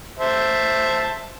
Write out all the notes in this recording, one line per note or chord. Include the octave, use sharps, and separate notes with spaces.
C5 E5 A5